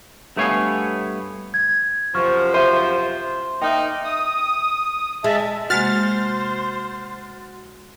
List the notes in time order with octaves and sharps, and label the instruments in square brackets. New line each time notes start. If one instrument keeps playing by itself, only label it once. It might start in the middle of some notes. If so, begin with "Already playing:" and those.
[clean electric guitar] G2 A3 B3 C#5 F5 G#5
[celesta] G#6
[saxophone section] F#2 C3 F3 [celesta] C#6 F6
[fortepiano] C5 [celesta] E5 D#7
[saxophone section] A#3 D#4 [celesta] E5 G5
[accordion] D#6
[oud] G#3 [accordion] E5 A5
[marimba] C3 G#3 A#3 [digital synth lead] F#4 [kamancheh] C5 [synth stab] F6 A6